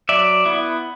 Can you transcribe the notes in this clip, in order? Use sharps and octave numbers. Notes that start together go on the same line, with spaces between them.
F#3 D5 E5
B3 E4